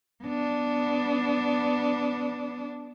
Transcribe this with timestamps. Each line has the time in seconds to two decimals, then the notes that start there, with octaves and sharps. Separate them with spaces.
0.23 B3 D4